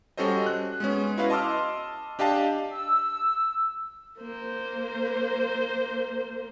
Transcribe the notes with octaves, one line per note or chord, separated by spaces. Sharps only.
G3 C#4 F#4 A4 C5 D#5
F#6
G#3 B3 C#4
E4 F#4 B4 F5
D#5 A5 C6 D6 E6 F6
D4 G4 D#5 F5 A5
E6
A#3 C5